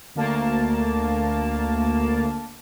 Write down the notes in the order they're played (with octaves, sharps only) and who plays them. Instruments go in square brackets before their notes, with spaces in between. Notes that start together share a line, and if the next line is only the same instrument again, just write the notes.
[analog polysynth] D2 A#3 A5